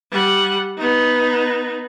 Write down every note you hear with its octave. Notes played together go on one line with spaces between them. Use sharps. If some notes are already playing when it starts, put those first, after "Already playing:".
G3 F#5
B3 D#4